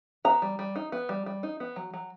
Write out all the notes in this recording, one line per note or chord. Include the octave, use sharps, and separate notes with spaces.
B3 A#5
G3
G3
D#4
B3
G3
G3
D#4
B3
F#3
F#3